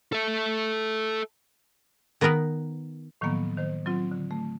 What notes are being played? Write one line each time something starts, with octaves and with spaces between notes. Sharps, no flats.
A4 E5
D#3 B3 D#4 A#4 B4
A2 D#3 F3 F#3 A#3 B3
D#3 C5
F#3 C4 F4
D3
A3